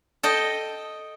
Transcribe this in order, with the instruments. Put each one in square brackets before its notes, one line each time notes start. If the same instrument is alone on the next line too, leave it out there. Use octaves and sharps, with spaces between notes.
[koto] A4 D#5 G5